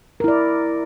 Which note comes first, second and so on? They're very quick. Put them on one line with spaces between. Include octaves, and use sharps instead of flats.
A#4 E4 D5